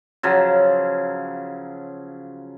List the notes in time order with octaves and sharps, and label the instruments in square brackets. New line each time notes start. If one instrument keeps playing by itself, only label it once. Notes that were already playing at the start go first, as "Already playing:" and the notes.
[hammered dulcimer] C#3 F3 F#3